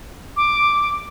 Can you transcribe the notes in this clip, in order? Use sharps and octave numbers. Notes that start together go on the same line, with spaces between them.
D6